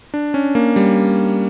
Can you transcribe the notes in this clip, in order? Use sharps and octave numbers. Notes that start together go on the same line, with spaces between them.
D4
C#4
A#3
G3